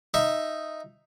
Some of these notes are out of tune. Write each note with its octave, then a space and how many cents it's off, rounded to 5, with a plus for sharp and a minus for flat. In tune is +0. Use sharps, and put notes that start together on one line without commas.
D#4 +0 E5 +5